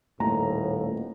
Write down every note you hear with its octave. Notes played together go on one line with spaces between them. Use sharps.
D#1 A2 A3 A#3 A#5